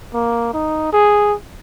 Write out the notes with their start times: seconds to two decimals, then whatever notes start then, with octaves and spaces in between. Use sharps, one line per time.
0.14 A#3
0.53 D#4
0.93 G#4